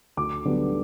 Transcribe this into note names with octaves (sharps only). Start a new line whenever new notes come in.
D2 D6
D3 G3 B3